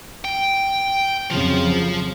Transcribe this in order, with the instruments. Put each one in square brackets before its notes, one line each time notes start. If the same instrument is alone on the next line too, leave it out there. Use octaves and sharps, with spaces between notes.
[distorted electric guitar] G5
[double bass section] F2 C#3 F#3 [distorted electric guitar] F3 F4